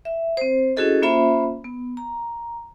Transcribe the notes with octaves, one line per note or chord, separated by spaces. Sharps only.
E5
C4 C5
C#4 E4 F#4 G#4 A4 D#5
A#3 C#4 F4 C5 E5 B5
B3
A#5